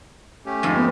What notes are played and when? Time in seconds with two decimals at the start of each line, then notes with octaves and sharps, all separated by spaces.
0.46 A3 C#4 G4
0.63 F2 G#2
0.77 B3